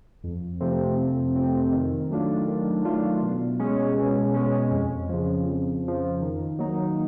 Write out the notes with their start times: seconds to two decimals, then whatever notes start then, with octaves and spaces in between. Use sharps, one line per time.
0.24 F2
0.60 C3 F3 A3 C4
0.97 F2
1.36 C3 F3 A3 C4
1.72 D#3
2.10 F#3 A3 D4 F4
2.47 D#3
2.84 F#3 A3 D4 F4
3.22 B2
3.59 G#3 C#4
3.97 B2
4.34 G#3 C#4
4.71 F2
5.09 C#3 F3
5.46 F2
5.83 C#3 F3
6.21 D#3
6.58 F#3 A#3 D#4